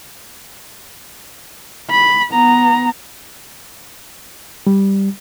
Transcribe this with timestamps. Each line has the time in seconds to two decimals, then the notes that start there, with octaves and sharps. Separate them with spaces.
1.91 B5
2.32 B3 A#5
4.67 G3